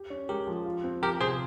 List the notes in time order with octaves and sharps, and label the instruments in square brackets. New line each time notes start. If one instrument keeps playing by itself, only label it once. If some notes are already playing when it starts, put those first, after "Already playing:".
Already playing: [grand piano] G4
C#4
[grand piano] G#3 [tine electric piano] G4 A#4
[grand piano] F3
F4
C4
[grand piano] F3 [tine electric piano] G4 A#4
[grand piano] C3 [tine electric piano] G#4 C5